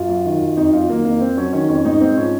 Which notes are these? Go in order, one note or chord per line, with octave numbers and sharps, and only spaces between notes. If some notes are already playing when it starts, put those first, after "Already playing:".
Already playing: F#2 F4
F#3
D#3
F#2
F2 D#4
F#3 F4
D#3 A#3
F2 A#3
F2 C4
F#3 C#4
D#3 C#4
F2 C#4
G#2 D#4
G#2 C4
F3 C#4